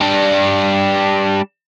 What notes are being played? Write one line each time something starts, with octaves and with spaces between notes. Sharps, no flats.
G3 D4